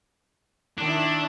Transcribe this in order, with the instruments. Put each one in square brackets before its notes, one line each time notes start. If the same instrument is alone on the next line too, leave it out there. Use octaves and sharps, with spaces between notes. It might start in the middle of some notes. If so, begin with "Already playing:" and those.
[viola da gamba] D#3 E4 [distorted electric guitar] D4